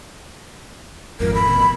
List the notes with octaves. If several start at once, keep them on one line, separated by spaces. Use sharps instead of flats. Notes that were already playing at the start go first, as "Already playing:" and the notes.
G#1 F2 A#4
B5
A1 B2